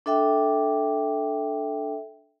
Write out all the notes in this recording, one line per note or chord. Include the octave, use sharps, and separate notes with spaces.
D4 A4 E5 G5